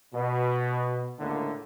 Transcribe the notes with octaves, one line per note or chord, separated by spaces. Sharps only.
B2
C#2 A2 D3 A#3